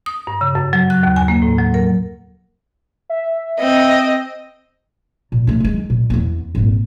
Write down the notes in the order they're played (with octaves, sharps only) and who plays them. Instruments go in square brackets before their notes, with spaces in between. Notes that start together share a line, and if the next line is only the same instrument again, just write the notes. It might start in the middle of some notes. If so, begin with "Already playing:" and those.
[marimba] D#6
G2
C#3
F#2
F#3
F#6
D#2
G#5
A#3
A2
F#3
A#4
[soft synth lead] E5
[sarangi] C4 [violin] D#5
[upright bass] A#2
D3 A3
D#3 G#3
A#2
E2 B3
G#1 A#2